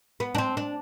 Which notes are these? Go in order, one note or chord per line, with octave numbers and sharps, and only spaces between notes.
B3
D4
C4
D4